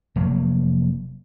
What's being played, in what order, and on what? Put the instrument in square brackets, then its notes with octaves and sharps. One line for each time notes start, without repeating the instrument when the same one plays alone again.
[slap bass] F1 F#3 A#3